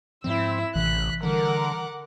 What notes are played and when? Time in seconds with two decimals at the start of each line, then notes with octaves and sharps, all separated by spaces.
0.24 G#2 F3 C4 E4 E6
0.75 A1 C3 E3 F#6 B6
1.23 D3 E3 F3 G3 A#4 F#5 D6